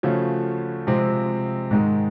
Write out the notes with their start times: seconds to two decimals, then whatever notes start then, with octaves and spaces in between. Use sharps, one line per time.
0.03 C#3 F3 A3 C#4 F#4
0.87 C3 F3 G#3 C4
1.71 G#2 D#3 G#3